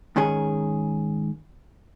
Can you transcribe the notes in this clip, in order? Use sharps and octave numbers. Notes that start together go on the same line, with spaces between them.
G#2 D#3 C#4 G#4